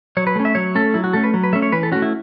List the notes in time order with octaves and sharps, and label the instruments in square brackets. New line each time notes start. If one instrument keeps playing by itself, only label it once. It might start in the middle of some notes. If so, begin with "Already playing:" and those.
[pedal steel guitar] F#3 C#5
B4
A3 C#4
E5
F#3 C#5
A3 C#4 A4
F#3 E4
F#4
A3 C#4 A4
B4
F#3
B4
A3 C#4 E5
C#5
E3 B4
A4
A3 C#4 F#4
E4